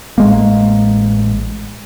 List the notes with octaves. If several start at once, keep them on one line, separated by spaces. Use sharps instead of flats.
A1 G#3 A#3